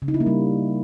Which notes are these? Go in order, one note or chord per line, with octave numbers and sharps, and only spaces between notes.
C#3
D#4
E4
A#3
G3